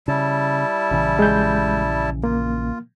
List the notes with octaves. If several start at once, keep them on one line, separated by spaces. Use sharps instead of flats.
C#3 G3 E4 A5
A#1 C#3 E3
G#3 G6
A#3 F4